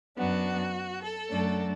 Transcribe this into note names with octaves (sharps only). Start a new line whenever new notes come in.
F#2 F#3 B3 D4 F#4
A4
F#2 F#3 A3 D4